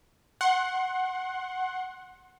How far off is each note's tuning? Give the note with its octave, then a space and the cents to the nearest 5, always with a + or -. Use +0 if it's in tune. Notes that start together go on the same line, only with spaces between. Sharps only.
F#5 +0 C6 +30